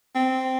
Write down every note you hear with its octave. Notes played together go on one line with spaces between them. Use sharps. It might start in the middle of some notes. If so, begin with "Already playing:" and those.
C4